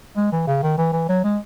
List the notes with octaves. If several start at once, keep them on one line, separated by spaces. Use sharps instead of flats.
G#3
E3
C#3
D#3
E3
E3
F#3
G#3